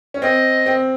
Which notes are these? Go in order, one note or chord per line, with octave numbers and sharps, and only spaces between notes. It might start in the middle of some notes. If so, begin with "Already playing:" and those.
C#4
C4 D#5
C4